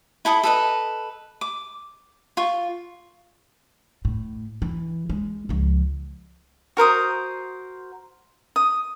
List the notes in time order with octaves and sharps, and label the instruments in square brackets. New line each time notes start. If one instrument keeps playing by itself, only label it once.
[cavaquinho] E4 A4 B5 D#6
A4 B4 D#5
D6
F4 C#6
[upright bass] A2
E3
G#3
C#2 F3
[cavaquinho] F#4 A#4 C5 D#6
D#6